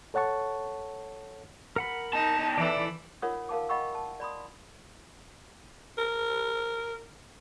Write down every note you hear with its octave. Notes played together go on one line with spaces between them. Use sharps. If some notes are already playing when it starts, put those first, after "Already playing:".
A4 C#5 F#5 A5 C#6
A#4 F#5 B5
E2 D#4 A5
E3 E4 A4 D5
D#4 F4 A#4 C#5 F#5 D#6
A#4 F5 A5 D6
D#5 F#5 G5 B5 C#6 E6
A5
D5 B5 C6 D#6
A#4